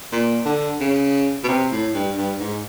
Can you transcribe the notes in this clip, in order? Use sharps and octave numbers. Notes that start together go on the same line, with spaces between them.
A#2
D3
C#3
B2
C3
A2
G2
G2
G#2